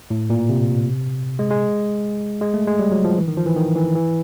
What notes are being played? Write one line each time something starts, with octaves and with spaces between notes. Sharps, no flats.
A2
A#2
C3
G#3
G#3
G#3
A3
G#3
G3
F#3
F3
E3
D#3
F3
E3
D#3
E3
E3